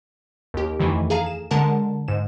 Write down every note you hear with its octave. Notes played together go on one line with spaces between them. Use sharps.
D#2 G4
F2 D#3 E3 A3
G#4 A4 F5 A#5
E7
D3 G#3 A#4 F#5 A5 A#5
G#2 E7